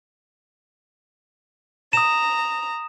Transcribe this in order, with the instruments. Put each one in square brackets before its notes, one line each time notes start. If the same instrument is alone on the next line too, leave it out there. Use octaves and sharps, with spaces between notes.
[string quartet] A#5 [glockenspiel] D#6 E7